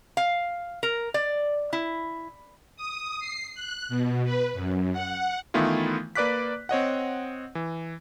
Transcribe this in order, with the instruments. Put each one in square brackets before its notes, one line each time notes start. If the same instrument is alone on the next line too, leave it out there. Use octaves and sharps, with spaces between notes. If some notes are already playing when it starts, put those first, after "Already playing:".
[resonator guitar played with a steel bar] F5
A#4
D5
E4
[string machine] D#6
C7
F#6
B2
B4
F#2
F#5
[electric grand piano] D#3 E3 A3 B3 E4 F4
A#3 B4 D5 D6 F#6 B6
C4 C#5 D#5 F#5
E3